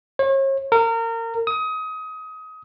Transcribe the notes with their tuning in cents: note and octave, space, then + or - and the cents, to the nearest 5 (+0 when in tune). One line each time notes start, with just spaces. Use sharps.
C#5 -40
A#4 -30
D#6 +25